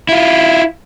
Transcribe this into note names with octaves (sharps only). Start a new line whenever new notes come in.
E4 F4